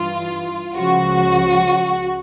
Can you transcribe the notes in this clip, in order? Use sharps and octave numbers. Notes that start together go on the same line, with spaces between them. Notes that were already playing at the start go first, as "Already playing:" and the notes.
Already playing: G2 E3 F4
C#2 C#3 F3 F#4